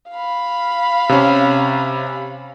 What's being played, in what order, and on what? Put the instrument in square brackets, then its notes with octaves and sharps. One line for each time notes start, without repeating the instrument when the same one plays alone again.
[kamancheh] F5 B5
[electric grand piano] C3 C#4